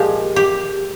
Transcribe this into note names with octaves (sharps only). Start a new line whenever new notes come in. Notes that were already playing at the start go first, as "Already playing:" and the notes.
Already playing: A#2 F3 G#3 G4
G4